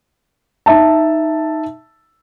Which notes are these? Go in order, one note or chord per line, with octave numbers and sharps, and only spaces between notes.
D#4 E5 A5